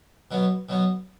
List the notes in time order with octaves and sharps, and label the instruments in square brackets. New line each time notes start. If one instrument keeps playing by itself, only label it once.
[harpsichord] B2 F#3 B3
B2 F#3 B3